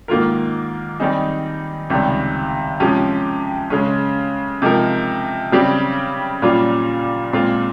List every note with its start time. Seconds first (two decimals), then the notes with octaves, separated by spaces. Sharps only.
0.08 G#2 D#3 A#3 F4 A#4
1.00 D#3 G3 C4 D#4 G#4
1.90 C#2 C3 D#3 G3
2.80 C3 F3 G#3 C#4 G4
3.70 C#3 G#3 C#4
4.62 C3 F3 G#3 D#4 A#4
5.52 C#3 G3 C4 G4
6.42 A#2 G3 C#4 F4
7.33 A#2 G#3 C4 F4